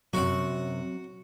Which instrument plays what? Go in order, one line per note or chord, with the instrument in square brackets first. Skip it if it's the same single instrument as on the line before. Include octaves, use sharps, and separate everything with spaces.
[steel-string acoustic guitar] F#2 C3 [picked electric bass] F#3 C4 [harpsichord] F#4 F#5